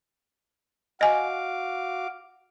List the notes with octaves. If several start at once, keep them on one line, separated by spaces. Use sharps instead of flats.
F#4 D#5 F5 G#5 D6